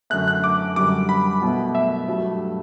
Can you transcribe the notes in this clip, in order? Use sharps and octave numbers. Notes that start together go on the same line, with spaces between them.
F#2 D3 A3 F#6
F#6
D6
F#2 D3 G3 D6
B5
B2 F#3 A3
E5
G2 F#3 A3